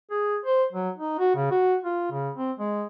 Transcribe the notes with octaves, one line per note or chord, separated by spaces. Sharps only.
G#4
C5
F#3
D#4
F#4
C#3
F#4
F4
C#3
C4
G#3